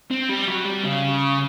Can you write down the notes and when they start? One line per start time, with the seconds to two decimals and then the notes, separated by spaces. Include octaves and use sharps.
0.11 C4
0.29 G3
0.48 F#3
0.65 G3
0.84 C#3